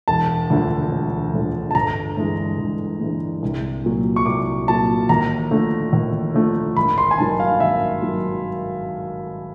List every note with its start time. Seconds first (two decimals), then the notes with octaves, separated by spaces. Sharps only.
0.08 E1 A5
0.50 D2 D3 F3
0.91 E1
1.34 D2 D3 F3
1.71 A5
1.75 G1 A#5
2.17 G2 E3 G#3
2.59 G1
3.00 G2 E3 G#3
3.42 C2
3.84 A#2 F#3
4.16 C#6
4.26 C2 D6
4.68 A#2 F#3 A5
5.09 D#2 A#5
5.51 D3 F3 A3
5.93 D#2
6.34 D3 F3 A3
6.76 G#1 B5
6.98 C6
7.11 G#5
7.18 G2 D#3 F#3 A5
7.40 F5
7.60 G#1 E5
8.02 D#3 F#3